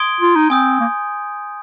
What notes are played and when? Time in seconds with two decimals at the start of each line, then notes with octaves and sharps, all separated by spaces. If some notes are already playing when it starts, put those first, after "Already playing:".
Already playing: C6 D#6 G#6 D7 G7
0.20 F4
0.36 D#4
0.50 C4 G#5 D#6 G6
0.80 A#3